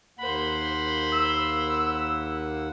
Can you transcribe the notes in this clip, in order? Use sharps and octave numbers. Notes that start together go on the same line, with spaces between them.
D#2 A#3 C5 F#5 B5
E6